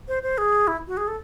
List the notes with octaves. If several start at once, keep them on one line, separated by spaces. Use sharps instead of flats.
C5
C5
G#4
E4
F#4
G#4
A4